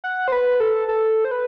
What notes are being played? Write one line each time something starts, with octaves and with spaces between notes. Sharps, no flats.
F#5
C5
B4
A4
A4
C5
B4